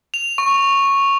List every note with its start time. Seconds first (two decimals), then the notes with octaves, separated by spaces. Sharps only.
0.14 F7
0.38 C#6